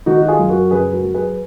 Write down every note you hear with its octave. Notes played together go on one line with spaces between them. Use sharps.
D#3 D#4 F#4
F#4
F4 G#4
F#2
F#4 A#4
F#1 G#4 B4
F#4 A#4
F#3
G#4 B4